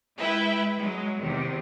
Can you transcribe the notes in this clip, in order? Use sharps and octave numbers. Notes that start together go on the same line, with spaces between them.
G#3 E4 B4 E5 G5
F#3 G#3
E2 C3 D#3